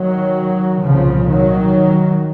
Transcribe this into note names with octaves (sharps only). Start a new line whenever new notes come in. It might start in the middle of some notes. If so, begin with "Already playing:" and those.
Already playing: D#3 F#3
C2 A#2 C#3 F3
D#3 F#3